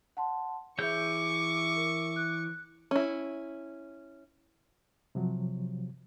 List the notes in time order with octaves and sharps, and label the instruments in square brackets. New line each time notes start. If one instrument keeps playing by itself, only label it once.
[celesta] F#5 A5 C6
[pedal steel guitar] E3 C#5 G6 [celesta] G#4 E5 [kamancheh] C#6 D6
[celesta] A#4
F#6
[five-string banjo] C#4 E4
[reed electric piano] C3 F3 F#3